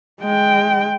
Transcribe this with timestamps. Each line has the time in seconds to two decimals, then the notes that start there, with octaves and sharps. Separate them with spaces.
0.21 G#3 G5